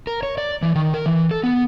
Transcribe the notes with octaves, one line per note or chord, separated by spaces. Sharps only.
A#4
C#5
D5
E3
D#3
A#4
E3
A4
B3